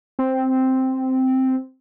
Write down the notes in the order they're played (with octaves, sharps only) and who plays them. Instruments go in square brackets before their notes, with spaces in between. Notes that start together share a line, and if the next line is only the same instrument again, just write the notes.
[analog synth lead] C4